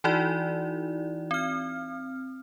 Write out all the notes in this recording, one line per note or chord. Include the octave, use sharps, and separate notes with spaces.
E3 D#4 E4 F#4 D5
C4 F6